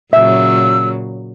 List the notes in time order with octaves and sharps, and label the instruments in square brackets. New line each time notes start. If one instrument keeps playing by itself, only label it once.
[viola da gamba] A#2 C#3 F#3 [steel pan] E5 [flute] E6